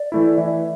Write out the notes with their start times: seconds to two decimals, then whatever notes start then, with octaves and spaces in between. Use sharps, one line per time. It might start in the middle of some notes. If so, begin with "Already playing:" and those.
Already playing: D5
0.12 E3 A3 E4
0.37 E3 E5